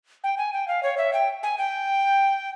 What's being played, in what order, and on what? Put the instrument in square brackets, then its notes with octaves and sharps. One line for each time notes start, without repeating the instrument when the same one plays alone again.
[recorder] G5
G#5
G5
F5
C#5
E5
G5
G#5
G5